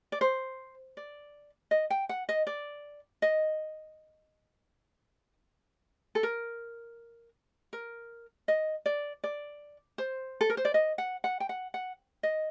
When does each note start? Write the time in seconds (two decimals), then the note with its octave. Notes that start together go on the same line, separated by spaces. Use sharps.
0.12 D5
0.21 C5
0.97 D5
1.71 D#5
1.90 G5
2.09 F#5
2.29 D#5
2.47 D5
3.22 D#5
6.15 A4
6.23 A#4
7.73 A#4
8.48 D#5
8.86 D5
9.24 D5
9.98 C5
10.41 A4
10.50 A#4
10.57 C5
10.65 D5
10.74 D#5
10.98 F#5
11.24 F#5
11.40 G5
11.49 F#5
11.74 F#5
12.23 D#5